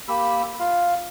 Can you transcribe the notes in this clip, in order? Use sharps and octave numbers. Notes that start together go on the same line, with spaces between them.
A#3 G4 B5 E6
F4 F5